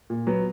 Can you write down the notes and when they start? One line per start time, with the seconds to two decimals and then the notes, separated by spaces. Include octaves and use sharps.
0.10 A#2
0.27 F#3 B3